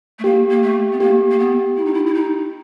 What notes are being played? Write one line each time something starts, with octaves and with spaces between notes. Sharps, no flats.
A3
A#3 G4
A#3
A3
B3
A#3 G4
A#3
B3
E4
D#4
E4
E4
D#4